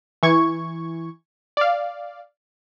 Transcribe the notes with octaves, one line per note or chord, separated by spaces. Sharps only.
E3 C#6 G#6
D5 F5